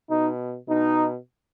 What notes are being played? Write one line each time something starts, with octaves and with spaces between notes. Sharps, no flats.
B2 D#4
B2 D#4